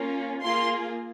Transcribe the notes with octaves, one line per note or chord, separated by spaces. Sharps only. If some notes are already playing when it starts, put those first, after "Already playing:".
Already playing: A#3 C#4 F4
A#3 F4 G#4 C6